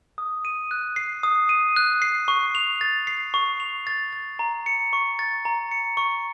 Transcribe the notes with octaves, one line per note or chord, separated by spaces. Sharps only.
D#6
D#7
F#6
C7
D#6
D#7
F#6
C7
C#6
F7
A6
C7
C#6
F7
A6
A6
A#5
C#7
C#6
A6
A#5
C#7
C#6